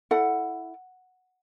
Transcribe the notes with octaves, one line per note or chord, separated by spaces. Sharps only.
E4 A4 F#5